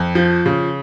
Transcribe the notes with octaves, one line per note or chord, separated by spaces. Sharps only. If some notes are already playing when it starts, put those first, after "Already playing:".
Already playing: F2
F3
C#3